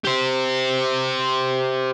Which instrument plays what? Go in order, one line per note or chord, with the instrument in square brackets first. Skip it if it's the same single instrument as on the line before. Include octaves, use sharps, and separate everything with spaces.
[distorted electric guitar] G4 C5